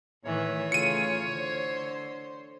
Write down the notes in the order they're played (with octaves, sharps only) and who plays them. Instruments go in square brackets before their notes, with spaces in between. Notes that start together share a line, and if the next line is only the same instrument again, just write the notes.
[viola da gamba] A2 D#3 E3 [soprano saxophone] C#5
[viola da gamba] C#3 A3 F4 [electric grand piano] C#7 D#7
[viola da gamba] D3 C5